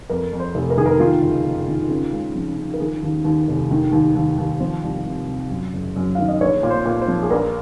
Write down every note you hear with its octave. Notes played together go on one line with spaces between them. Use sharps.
F2 A#4
F2
C5
F1
A#4
D#3 G#4
A#4
D#3 F4
F#1
F#1
D#3
C#3
C#2
F3
C#3
A#4
D#3 G#4
D#2
D#2
F1
D#3
D#2
D#2
D#2
F3 C5
C2
C3
C3
F#2
F#1
F#2
D#3 F5
D#5
A#1 C#5
A#2
C5
A#2
C5
F3
G#4
A#1 A#4